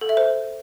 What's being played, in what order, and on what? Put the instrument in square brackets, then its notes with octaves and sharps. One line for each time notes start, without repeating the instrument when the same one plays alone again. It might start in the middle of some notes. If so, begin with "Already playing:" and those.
[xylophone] A4
E5
C5